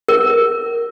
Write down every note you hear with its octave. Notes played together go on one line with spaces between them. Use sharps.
A#4